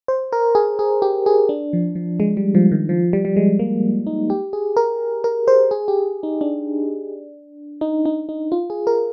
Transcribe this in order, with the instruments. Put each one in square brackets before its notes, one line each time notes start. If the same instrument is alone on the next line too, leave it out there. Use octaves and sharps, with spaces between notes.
[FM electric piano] C5
A#4
G#4
G#4
G4
G#4
D4
F3
F3
G#3
G3
F3
D#3
F3
G3
G3
G#3
A#3
D#4
G4
G#4
A#4
A#4
C5
G#4
G4
D#4
D4
D#4
D#4
D#4
F4
G#4
A#4